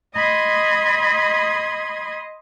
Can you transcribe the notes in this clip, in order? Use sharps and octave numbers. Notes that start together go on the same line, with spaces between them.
D#5 B5 C6 D#6 G#6